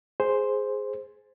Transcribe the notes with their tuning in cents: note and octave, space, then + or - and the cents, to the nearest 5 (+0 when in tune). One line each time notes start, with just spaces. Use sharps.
G#4 +0 C5 +0